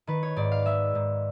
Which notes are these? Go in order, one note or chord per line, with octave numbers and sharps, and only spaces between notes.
D#3 B4
C#5
G#2 D5
F5
G#3 E5
G#2